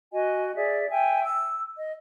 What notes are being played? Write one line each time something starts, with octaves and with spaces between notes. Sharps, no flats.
F#4 D#5 G#5
G#4 D5 E5
E5 G5 G#5
E6
D#5